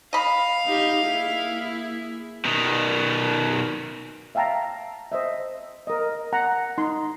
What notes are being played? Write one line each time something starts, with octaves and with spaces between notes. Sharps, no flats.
D#5 F5 B5
D#4 G4
A#3 E4 G#4
B2 D#3
E5 F5 G5 A5 A#5
C5 D#5 E5
A#4 D#5
F#5 A#5
D#4 C6